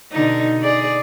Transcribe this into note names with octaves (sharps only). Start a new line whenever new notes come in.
B2 D3 D#4
G#4 D5